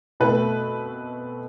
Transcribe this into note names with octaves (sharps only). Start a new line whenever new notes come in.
B2 A3 C4 B4